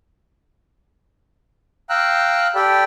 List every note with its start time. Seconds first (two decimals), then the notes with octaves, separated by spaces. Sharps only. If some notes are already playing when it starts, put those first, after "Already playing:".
1.90 F5 G5 A#5 E6 F#6
2.55 G4 A4 D5 G5 B5